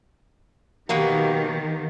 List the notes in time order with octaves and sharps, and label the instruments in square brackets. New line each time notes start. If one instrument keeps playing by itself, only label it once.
[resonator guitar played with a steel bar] B2 F#3 A#3 [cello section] D#3 [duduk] G4